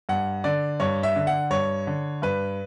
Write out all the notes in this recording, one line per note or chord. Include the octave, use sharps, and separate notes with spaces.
G2 F#5
D3 D5
G2 C#5
E5
D3
F#5
G2 C#5
D3
G2 B4